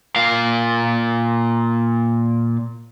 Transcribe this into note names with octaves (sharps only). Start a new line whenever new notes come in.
A#2 F5